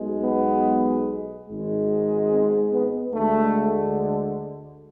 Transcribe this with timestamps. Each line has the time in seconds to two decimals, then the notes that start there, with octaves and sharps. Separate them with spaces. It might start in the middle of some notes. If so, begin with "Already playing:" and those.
Already playing: B1 B2 G#3
0.23 B3
1.48 G#1 G#2 G#3
2.31 C4
2.72 B3
3.14 D2 D3 G#3 A3